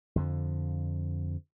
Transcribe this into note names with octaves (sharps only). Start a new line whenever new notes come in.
F2 D3 F3